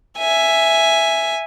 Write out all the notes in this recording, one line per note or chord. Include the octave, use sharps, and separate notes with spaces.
E5 G#5